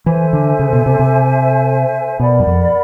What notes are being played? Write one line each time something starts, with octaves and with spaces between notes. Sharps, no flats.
E3 A4 C5 E5 G#5
D3
C#3
B2
C3
C3
B2 A#4 D5 F#5 B5
F#2
F2